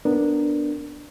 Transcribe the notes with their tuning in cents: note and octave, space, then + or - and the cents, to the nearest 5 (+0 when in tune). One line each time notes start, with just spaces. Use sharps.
B3 +0 D4 +0 A#4 -10